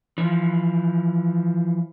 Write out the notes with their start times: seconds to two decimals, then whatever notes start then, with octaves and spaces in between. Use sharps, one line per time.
0.18 E3 F3